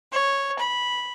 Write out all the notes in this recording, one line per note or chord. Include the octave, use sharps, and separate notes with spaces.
C#5
B5